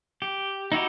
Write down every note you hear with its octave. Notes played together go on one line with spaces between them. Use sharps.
G4
D#4 E4 F#4 G4